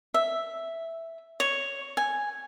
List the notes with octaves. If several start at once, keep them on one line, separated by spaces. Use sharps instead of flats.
E5
C#5
G#5